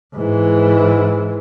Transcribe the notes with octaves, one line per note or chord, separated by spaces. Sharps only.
G#2 E3